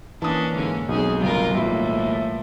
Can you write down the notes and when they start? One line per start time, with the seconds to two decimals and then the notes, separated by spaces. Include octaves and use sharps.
0.22 E3 A#3 C#4 D4 A5 D#6
0.56 G#2 D3 G#3 A#3 C#4
0.89 B1 G#3 C4 C#4 D#4 G#4
1.21 F#1 D2 G3 F4 A#4
1.53 A2 E3 G3 A#3 F4